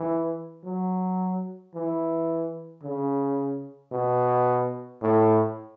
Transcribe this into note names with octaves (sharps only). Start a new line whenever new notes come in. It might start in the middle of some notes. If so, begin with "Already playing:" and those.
Already playing: E3
F#3
E3
C#3
B2
A2